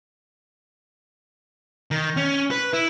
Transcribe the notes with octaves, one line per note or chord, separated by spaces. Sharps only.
D#3
C#4
B4
E4